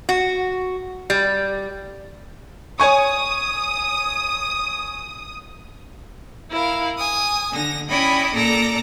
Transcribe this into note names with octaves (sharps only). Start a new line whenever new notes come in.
F#4
G3
C#5 G#5 C#6 D#6
E4 A#4 F5
G#5 D#6
D3 A#6
C#4 E4 D5 D#5 G5 B5
A#2 A4 D5 A#5 A#6